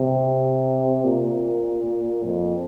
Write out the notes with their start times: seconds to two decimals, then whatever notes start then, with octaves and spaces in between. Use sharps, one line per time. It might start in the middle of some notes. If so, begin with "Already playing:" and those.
Already playing: C3
1.05 A#2
2.24 F2